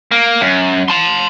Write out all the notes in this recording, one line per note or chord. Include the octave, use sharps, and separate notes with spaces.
A#3
F#2
A5 C6